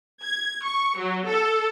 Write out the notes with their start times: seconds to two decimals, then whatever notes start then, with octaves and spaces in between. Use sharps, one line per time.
0.23 G#6
0.63 C#6
0.97 F#3
1.28 A4